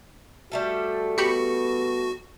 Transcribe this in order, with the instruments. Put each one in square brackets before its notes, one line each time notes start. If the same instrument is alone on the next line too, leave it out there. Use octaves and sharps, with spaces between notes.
[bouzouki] G3 A3 A4 [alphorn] F#4
[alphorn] B3 [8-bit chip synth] F#4 [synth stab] G4 B5 C#7